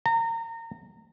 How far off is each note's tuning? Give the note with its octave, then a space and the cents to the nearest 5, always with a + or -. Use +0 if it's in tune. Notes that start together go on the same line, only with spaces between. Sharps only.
A#5 -30